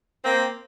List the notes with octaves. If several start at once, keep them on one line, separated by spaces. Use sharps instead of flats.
A#3 C4